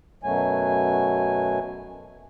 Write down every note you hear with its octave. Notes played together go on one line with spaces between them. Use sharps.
F#2 B2 F#3 A3 G#5